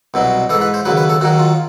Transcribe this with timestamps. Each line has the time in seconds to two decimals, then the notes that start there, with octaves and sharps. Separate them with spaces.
0.14 C2 B2 F#3
0.49 E3 A4
0.54 G#2
0.61 B4
0.74 C5
0.85 D#2 C#3 F#3 B4
0.97 B4
1.09 A4
1.21 D#2 D#3 F#3 F#4
1.39 F4